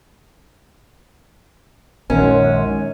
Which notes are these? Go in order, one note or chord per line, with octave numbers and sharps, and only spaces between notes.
A#1 F#2 D#3 G#3 C#4